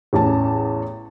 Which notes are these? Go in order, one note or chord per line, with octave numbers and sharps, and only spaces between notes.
A1 E2 C#4 A5